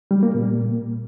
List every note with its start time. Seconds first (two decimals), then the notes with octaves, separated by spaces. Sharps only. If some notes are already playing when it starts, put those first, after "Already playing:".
0.11 G3
0.23 A#3
0.35 A#2